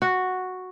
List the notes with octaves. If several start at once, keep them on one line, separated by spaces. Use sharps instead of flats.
F#4